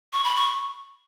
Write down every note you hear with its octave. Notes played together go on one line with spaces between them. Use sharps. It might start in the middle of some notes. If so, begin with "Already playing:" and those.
C#6
B5
C#6